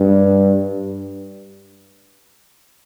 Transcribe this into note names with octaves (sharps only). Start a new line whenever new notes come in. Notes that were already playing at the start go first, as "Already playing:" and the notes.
Already playing: G2